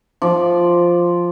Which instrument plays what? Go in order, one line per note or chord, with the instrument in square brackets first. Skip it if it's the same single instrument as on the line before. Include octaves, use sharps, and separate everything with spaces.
[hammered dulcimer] F3 D5